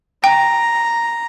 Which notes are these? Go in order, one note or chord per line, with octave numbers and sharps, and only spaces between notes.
G5 A#5